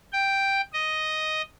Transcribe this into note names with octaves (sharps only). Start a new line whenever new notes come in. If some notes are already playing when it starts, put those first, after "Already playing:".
G5
D#5